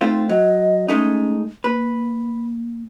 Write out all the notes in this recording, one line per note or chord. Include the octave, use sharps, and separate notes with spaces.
A3 C4 D#4 F4
F#3 D#5
G#3 A3 C#4 D#4
A#3 B4